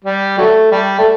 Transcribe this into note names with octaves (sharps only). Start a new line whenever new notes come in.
G3
F#3 A3
G3
A3